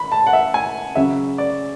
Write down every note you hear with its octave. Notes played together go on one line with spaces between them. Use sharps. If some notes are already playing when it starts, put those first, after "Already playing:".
Already playing: B5
A5
F#5
E5
G#5
C#3 F#3 C#4 E5
D5